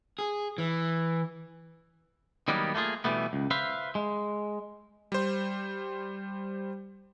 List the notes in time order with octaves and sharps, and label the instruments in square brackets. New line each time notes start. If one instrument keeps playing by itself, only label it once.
[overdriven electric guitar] G#4
E3
[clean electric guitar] D#3 F#3 G3 A#3 B3
A3 A#3 F4 G#4
B2 E3 F3 G3 A3 B3
C#2
B4 C5 E5 F5
G#3
[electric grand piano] G3 C5